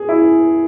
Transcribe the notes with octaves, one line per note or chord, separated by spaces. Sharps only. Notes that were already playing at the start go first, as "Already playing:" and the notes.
Already playing: G#4
E4